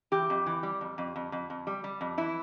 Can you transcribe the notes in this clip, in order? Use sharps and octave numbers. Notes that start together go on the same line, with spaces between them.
E3 G4
F2
E3
G3
F2
F2
F2
F2
F2
G3
G3
F2
E3 E4